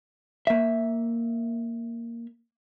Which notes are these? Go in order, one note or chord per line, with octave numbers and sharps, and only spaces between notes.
A#3 E5